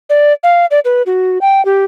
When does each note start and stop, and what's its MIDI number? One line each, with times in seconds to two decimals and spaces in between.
0.10 0.33 74
0.43 0.66 77
0.71 0.79 74
0.85 1.02 71
1.06 1.38 66
1.41 1.64 79
1.65 1.85 67